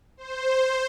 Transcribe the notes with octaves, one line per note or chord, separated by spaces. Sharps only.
C5
C5